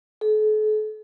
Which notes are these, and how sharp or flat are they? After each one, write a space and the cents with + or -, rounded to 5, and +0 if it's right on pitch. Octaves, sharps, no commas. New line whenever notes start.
A4 -45